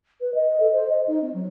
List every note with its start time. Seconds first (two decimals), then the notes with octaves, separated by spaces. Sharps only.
0.21 B4
0.34 D#5
0.60 A4
0.72 C5
0.89 D#5
1.07 D#4
1.22 C4
1.34 F#3